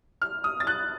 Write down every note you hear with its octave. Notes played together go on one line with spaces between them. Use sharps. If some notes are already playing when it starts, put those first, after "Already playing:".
F6
D#6
A6
F#6